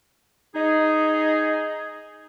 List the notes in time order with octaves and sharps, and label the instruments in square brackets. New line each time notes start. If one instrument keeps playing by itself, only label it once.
[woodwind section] D#4 G#4